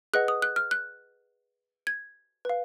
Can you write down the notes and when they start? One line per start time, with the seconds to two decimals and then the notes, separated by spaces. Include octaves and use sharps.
0.14 G#4 B4 D#5 F#5 F#6
0.28 D#6
0.42 F#6
0.56 F6
0.71 F#6
1.87 G#6
2.45 B4 F5